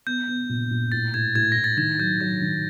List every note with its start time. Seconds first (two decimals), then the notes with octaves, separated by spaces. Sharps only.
0.07 B3 G6
0.28 B3
0.49 A#2
0.71 A#2
0.92 A2 A6
1.14 A2 G#6
1.35 A2 G#6
1.52 A2 A#6
1.64 A6
1.77 D#3 G#6
1.98 F#3 G6
2.20 F#3 G#6
2.41 D#3